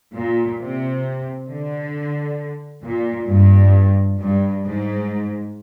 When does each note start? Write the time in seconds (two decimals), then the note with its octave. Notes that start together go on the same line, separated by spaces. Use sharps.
0.14 A#2
0.59 C3
1.49 D3
2.83 A#2
3.28 G2
4.18 G2
4.64 G#2